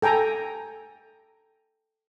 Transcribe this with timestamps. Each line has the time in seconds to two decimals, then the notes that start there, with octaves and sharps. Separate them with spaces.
0.02 A4 G5 G#5 A#5